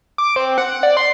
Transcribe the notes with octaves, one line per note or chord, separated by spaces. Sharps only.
D6
C4
F#5
F#5
D5
C6